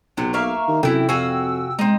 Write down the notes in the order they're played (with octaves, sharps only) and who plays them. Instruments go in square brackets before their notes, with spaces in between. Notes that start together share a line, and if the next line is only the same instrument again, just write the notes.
[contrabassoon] B1 [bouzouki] C3 F#3
[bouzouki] A#3 E5 F5 [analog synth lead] C#6
[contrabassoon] D#3
[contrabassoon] F#2 [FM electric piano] C3 G5 [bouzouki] E3 E4 [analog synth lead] A4
[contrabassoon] F2 [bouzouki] F#4 F5 G#5 [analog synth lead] E6
[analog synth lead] G#3 [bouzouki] C4 D#4